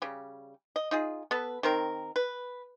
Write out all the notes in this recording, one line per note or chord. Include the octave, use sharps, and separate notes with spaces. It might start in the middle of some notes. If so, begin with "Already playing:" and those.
C#3 G3
D#5
D#4 F4 G#4
B3 A4 B4
D#3 C4 A#4
B4